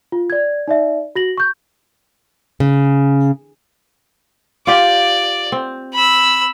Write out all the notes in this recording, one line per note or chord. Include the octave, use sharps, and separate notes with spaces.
F4
D5 G#6
D#4 D5 E5
F#4 A#6 F#7
C#6 G6
C#3
F4 G4 D5
C4
B5 E6